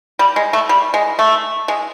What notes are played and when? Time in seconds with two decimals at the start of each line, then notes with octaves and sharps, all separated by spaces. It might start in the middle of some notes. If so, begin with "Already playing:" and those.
0.19 G3
0.36 G#3
0.53 A3
0.69 G3
0.94 G#3
1.19 A3
1.68 G#3